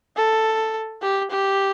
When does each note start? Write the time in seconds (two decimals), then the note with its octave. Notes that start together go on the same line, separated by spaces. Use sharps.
0.17 A4
1.02 G4
1.31 G4